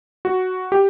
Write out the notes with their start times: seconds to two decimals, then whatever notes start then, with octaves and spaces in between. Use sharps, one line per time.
0.25 F#4
0.72 G4